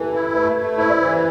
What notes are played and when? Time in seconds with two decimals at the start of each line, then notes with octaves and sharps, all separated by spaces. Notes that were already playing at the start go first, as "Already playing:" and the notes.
Already playing: E3 G4 A4 B4
0.13 E4
0.35 A3 B4
0.56 A3
0.78 E4 C5
0.89 D5
0.99 E3 C5